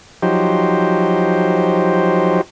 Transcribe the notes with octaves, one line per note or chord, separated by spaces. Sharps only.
F3 F#3 D#4 G4 C5